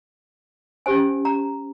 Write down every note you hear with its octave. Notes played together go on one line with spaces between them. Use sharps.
C#4 G4 C5 G#5
A#5